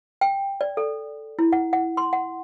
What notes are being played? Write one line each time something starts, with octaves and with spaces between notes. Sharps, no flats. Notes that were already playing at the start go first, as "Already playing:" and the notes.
G5
D5
A4
E4
F#5
F#5
C6
F#5